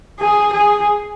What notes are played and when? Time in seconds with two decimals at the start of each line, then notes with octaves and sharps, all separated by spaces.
0.20 G#4
0.54 G#4